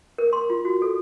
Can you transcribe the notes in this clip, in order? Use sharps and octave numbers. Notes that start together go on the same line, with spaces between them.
A#4
C6
F4
F#4
A4